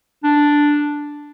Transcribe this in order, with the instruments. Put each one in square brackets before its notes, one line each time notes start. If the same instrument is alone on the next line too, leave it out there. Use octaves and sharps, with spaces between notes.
[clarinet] D4